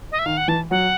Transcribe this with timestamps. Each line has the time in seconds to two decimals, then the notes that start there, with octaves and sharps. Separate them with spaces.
0.12 D#5
0.19 E5
0.26 D#3 F5
0.37 F#5
0.48 E3 A5
0.71 F#3 F#5